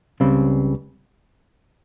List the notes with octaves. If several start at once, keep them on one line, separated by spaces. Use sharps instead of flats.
C#2 C#3 G3 C4